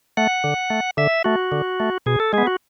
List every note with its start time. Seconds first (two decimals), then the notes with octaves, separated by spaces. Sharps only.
0.17 A3 F#5
0.44 D3
0.70 A3
0.97 D3 E5
1.24 A3 F#4
1.52 D3
1.80 A3
2.06 B2 G#4
2.20 A4
2.33 G#3 B3 G#4
2.47 F#4